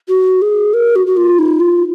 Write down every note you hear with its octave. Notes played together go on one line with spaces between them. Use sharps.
F#4
G#4
A#4
F#4
F#4
F4
D#4
F4